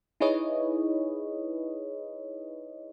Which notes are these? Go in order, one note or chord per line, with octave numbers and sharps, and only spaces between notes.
D#4 E4 G#4 B4 C#5 D#5